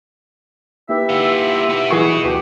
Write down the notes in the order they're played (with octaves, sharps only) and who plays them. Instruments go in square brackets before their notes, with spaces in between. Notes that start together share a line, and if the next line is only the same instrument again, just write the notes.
[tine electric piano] A#3 D#4 B4 [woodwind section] E4 G4 E5
[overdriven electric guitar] B3 F4
B3 F#4
[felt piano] E3 G#4 C#6
[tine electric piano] D2 G5 [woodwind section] G2 G4 [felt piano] F#4